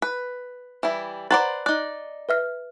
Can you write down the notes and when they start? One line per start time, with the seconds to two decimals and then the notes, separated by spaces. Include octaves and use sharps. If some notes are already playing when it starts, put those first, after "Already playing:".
0.02 B4
0.83 E3 G3 E4
1.31 B4 C5 D5 F#5 A#5 A6
1.66 D#4 D5 F#6
2.29 B4 E5 F6